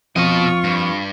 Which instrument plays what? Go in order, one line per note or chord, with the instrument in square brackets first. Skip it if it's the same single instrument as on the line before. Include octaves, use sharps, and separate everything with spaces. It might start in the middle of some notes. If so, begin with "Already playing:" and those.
[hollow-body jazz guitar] F2 [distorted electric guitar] B2 D#5 [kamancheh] F4 C#6
[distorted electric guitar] G2